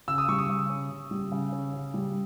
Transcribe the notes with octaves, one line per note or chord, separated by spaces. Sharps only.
C#3 E6
D#6
G3 C#6
D#6
C#3
C#4
C#3
G3
C#3
C#4
C#3
G3